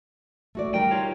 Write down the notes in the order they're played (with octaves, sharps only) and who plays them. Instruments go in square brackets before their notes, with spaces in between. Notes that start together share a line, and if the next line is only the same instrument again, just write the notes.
[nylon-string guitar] A3 F#4 D5
[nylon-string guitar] G3 D#4 A#4 [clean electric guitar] G5
[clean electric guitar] F4 C#5